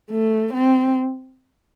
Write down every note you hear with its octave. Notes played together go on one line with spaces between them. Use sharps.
A3
C4